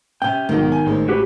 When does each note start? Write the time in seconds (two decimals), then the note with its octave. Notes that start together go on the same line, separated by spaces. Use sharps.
0.22 C3 C#4 G5
0.49 B1 G#2 D#3
0.72 G#5
0.86 A1 G#3 C4
1.09 F#4 G4 B4